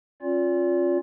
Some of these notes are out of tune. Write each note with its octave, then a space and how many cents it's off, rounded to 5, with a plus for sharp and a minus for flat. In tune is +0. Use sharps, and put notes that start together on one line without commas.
C#4 -35 F4 +15 D5 -35